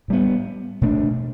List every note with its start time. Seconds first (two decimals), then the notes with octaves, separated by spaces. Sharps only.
0.08 A2 G3 B3
0.81 B2 A3 D4